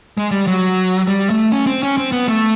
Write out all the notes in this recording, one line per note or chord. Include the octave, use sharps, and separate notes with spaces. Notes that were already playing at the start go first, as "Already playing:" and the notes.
G#3
G3
F#3
G3
A3
C#4
C4
C#4
C4
B3
A3